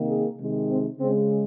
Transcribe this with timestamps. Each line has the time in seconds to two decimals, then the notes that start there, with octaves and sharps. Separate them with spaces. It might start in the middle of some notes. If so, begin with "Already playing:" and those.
Already playing: C3 D#3 A#3
0.08 G#4
0.38 C3 D#3 G#3
0.69 C4
1.00 C#3 G#3 C4